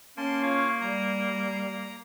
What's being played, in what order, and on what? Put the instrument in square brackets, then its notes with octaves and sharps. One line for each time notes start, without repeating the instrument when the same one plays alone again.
[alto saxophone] A#3 [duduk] C#4 [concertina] A5 C6
[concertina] F4 C#5 F5
[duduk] G3 [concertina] A#5